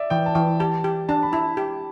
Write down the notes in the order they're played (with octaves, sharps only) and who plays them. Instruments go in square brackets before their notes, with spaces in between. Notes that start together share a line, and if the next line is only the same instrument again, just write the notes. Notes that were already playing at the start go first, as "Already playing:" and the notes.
Already playing: [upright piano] D5 E5
[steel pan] E3 [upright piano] G5
[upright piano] A5
[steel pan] E3 [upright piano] G5
[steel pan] G4 [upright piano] A5
[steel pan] G4
[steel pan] D4 [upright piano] A5
[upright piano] B5
[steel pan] E4 [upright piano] A5
[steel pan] G4